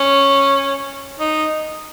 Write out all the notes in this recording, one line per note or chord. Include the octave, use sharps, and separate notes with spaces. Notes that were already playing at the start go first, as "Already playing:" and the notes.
Already playing: C#4
D#4